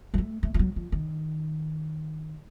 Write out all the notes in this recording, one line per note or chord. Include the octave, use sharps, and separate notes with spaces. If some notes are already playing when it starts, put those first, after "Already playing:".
F#3
A3
A3
F3
F#3
F3
D#3